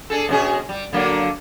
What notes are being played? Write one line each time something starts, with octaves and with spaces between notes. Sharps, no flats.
D4 G#4 A4
B2 C#4 G#4
G3
D3 F#3 A#3